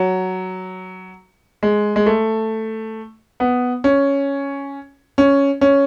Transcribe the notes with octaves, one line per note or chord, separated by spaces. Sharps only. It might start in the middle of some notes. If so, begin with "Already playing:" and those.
Already playing: F#3
G#3
G#3
A3
B3
C#4
C#4
C#4